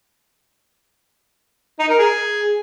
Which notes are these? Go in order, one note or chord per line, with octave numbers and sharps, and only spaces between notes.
D#4
A#4
G#4